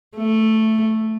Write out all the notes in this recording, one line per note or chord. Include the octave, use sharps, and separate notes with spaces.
A3